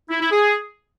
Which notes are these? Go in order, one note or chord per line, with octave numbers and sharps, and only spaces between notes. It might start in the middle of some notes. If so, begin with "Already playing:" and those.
E4
E4
G#4